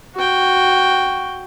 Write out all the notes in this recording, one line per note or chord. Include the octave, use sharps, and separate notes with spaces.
F#4 G5